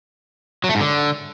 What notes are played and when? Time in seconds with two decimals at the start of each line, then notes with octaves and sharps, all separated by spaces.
0.64 F#3
0.69 A3
0.75 G#2
0.80 D3